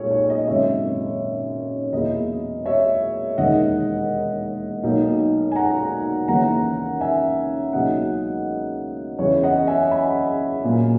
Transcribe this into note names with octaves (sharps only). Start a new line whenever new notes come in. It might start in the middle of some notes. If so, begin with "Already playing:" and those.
Already playing: B1 A#2 G#3 C#5
C#5
D#5
G#1 F#2 C#3 C#5 E5
E2 B2 A#3 E4 D#5
C#5 E5
E1 D#2 D#3 A#3 D#5 F#5
B1 B2 A#3 D#4
G#5
F#5 A#5
D#2 C#3 E3 A#3 C#4 F#5 A#5
E5 G#5
C#2 B2 F#3 A#3 D#4 D#5 F#5
F#1 E2 C#3 E3 C#5
D#5 F#5
E5 G#5
G#5 B5
A#2 F#3 A#3